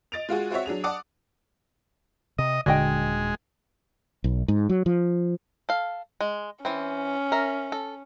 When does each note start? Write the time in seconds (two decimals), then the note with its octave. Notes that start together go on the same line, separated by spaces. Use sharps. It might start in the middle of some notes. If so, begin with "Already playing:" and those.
0.12 D#5 A6 D7 F7
0.29 G#3 F4 F#4 G#4
0.51 C4 F#4 C5 C#5 E5
0.66 F#3 D4 G#4 F7
0.84 D5 F#5 A5 D6 D#6
2.38 C3 D#5
2.66 D#1 A#2 D3 G#3 D4 F#4 D#5 G5
4.24 B1
4.48 G#2
4.69 F#3
4.86 F3
5.69 A4 F5
6.21 G#3
6.65 E3 C4 C#4
7.32 A#4 E5
7.72 A4